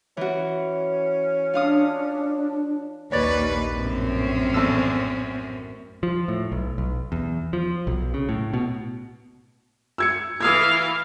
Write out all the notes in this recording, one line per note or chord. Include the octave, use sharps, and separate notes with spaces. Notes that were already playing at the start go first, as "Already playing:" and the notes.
E3 C#4 F#4
D4 F4 F5 D#6
A#1 D#2 B4 C#5 D5
F#2 A2 C4 C#4
E2 A4 E6
F3
A2
B1
B1
E2
F3
B1
C#3
A2
B2
E6 G#6 C#7
E3 F5 D#6 E6 G#6